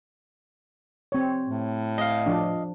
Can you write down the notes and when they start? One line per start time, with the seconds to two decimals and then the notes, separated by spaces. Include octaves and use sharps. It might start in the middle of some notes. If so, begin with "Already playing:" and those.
1.12 C4 C#5
1.46 A2
1.98 D#5 F5
2.26 F3 D4